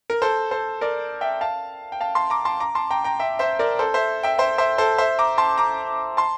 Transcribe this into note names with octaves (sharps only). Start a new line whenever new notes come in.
A#4
A4 C5
A4 C5
A#4 D5
E5 G5
F5 A5
G5
F5 A5
A5 C6
A#5 D6
A5 C6
A#5 D6
A5 C6
G5 A#5
G5 A#5
E5 G5
C5 E5
A#4 D5
A4 C5
C5 E5
E5 G5
C5 E5
C5 E5
A4 C5
C5 E5
A#5 D6
A5 C6
A#5 D6
A5 C6